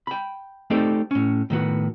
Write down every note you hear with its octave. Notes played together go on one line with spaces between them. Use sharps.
G5 B5
A3 C4 D#4 G4 A4 D5
A2 C#4
A2 D#3 B3 F#4